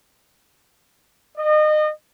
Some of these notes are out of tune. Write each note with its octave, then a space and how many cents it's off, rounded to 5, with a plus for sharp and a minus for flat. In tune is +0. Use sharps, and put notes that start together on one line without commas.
D#5 -30